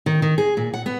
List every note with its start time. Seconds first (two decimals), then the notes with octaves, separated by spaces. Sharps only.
0.06 D#3
0.22 D#3
0.38 G#4
0.57 A#2
0.74 F#5
0.86 B3